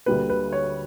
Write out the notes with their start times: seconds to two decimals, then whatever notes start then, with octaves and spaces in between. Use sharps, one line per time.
0.06 D2 D3 G3 A#3 B4
0.30 B4
0.52 C#5